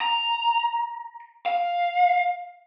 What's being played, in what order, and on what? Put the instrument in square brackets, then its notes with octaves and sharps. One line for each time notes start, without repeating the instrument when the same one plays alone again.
[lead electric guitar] A#5
F5